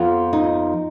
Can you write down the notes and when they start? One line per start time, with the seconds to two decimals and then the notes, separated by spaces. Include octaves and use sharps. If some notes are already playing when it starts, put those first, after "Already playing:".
Already playing: F2 F3 B3 F4
0.33 D#4